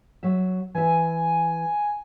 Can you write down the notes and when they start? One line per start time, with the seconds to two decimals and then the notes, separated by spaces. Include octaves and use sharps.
0.23 F#3 C#5 E5
0.75 E3 E5 G#5